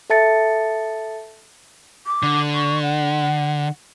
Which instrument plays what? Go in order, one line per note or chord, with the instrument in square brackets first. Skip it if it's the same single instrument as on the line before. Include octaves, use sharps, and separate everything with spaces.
[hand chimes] A4 E5 A5 A6 C#7
[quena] D6
[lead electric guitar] D3
[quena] C#6
F#5